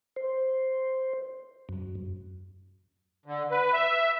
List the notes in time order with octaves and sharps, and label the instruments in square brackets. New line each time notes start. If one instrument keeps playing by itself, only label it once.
[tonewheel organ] C5
F#2
[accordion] D3
B4
E5